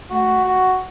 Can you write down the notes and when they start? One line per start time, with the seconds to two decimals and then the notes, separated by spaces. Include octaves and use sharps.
0.10 A3 F#4
0.44 F#4